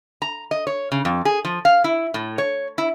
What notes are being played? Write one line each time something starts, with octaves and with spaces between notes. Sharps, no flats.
A#5
D#5
C#5
C#3
F2
G#4
F3
F5
E4
A2
C#5
E4